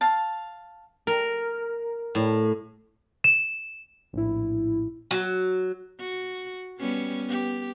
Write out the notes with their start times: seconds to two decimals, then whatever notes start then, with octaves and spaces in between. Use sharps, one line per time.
0.01 F5 A5
1.07 A#4
2.15 A2
3.24 E7
4.13 A#1 A2 E4
5.11 F#3
6.00 F#4
6.79 G3 B3 C#4
7.26 B3 G4